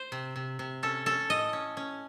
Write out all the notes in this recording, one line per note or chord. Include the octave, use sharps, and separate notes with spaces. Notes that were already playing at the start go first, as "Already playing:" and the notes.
Already playing: C5
C3
C3
C3
C#4 A4
C#4 A4
A2 D#5
C#4
C#4